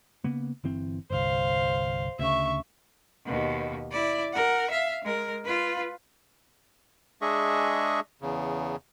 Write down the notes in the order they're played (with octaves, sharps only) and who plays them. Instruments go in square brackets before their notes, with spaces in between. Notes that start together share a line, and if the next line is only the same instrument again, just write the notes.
[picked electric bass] C#3 A#3 B3
G1 E3 C4
[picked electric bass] G1 C2 [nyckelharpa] C5 F5
[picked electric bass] D2 C#3 [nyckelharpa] E5 C#6
[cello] D#2 B2
E4 D5
A#4 F#5
E5 F5
G#3 A#4
F4 B4
[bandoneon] G#3 D4 G#4 D#5 E5 C#6
E2 C#3